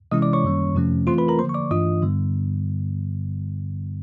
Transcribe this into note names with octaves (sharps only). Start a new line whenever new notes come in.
C3 E3 G#3 C#4 E4 D#5 D#6
D5 D6
C#5 C#6
F#2 D#3 G3 A#3 C#4
F2 C3 F3 A3 C#4
E3 A3 C4 F4 C5 C6
B4 B5
A#4 A#5
D3 F3 A#3 C5 C6
C#6
D5 D6
G2 E3 A3 D4 F4 D#5 D#6
G2 D3 G3 B3